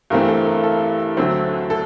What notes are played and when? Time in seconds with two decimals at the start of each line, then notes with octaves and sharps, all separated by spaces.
0.10 G2 E3 A3 C4 A#4
0.29 A4
0.46 A#4
0.64 A4
1.17 D2 D3 F#3 A3 C4
1.70 A4